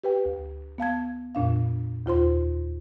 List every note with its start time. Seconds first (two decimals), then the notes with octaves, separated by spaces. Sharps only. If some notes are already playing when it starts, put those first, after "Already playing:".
0.04 G4 B4 G5
0.25 D2
0.78 B3 F5 A5 G#6
1.35 F2 A#2 D4 F5
2.06 D#2 F4 C5 C6